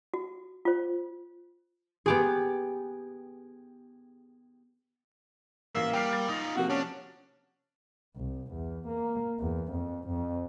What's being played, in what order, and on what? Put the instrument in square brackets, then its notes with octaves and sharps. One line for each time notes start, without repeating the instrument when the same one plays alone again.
[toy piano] F#4
F4 C5
[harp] B3 G4 G#4
[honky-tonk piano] A1 C7 [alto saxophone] A#3 [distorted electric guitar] E5
[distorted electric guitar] G3 [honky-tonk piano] G5 F6 C7
[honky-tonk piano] F6 A6
[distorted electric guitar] D#4 F4
[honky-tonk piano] C3 F3 A#3 [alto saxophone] F#4
[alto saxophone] C#4 [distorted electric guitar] D4
[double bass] C2
E2
A#3
E2
F2
F2